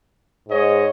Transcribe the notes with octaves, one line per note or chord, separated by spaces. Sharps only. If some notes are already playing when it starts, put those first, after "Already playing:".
G#2 C#5 D#5